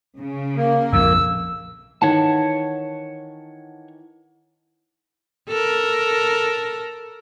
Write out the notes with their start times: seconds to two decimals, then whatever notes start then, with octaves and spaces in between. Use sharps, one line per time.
0.19 C#3
0.56 A#3
0.93 A#1 F2 E6
2.02 D#3 E3 C#5 F#5 A5
5.49 A4 A#4